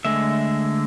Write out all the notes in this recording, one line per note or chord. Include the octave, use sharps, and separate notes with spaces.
D3 G#3 A3 E5